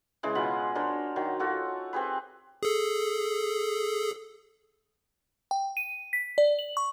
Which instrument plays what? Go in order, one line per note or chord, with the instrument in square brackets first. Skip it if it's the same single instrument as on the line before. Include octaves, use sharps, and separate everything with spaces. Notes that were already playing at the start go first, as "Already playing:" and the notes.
[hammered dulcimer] C#3 E3 G#3 G#4
B2 F4 F#5 B5
D4 A#4 C5 C#5
D#3 F#3
F4 F#4 A4 C#5
C4 G4 G#4 B4
[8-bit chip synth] G#4 A4
[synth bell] G5
D#7
B6
D5
F#7
C#6